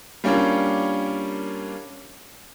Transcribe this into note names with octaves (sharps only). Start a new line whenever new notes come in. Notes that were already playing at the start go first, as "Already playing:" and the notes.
G3 A#3 C#4 D4 F4